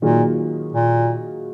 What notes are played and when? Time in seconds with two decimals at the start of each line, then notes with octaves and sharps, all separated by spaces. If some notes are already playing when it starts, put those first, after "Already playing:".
0.02 A#2 D#3 F#3 A#3 F4 G#4
0.73 A#2